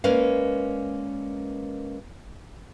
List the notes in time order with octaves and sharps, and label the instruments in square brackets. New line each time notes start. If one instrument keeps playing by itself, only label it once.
[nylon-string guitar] G#3 A#3 C#4 B4 D5 F5